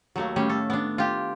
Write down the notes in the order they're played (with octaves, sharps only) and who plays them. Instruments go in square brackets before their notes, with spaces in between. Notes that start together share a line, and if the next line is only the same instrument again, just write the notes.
[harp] D#2 [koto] F#3 A3 A#3
[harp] A2 D#3 A3 [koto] G3 C#4
[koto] A4
B3 D4
[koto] F4 G4 [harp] G#5